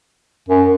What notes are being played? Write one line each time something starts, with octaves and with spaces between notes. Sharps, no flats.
F#2